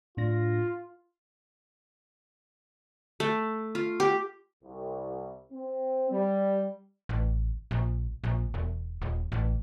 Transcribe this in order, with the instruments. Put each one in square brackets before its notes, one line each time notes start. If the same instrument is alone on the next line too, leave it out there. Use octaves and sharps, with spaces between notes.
[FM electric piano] A2 D4 A#6 [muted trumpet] F4
[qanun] A3
F4
G4
[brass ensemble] C2
C4
G3
[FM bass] A1
A#1
A#1
E1
D#1
A1